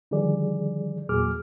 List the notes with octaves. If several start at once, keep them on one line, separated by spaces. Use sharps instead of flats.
D3 D#3 F3 G3 G#4 D5
E2 A#2 F#3 G#4 D6 F6